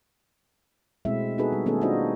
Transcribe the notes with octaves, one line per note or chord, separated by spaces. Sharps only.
B2 G#3 A3 C4 E4 E5
B3 D#4 F#4 G#4 A4 B4
G3
D#3 A3 B3 C#4 G#4 A4
D4 D#4 F4 F#4 C5 D#5